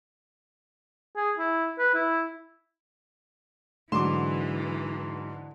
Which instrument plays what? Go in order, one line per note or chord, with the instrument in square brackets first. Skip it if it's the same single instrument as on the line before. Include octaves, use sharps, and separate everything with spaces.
[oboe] G#4
E4
B4
E4
[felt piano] G#2 F#3 [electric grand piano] D3 E7 [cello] E3 [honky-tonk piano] C6 D6